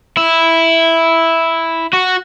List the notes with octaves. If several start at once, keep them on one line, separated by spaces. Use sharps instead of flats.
E4
F#4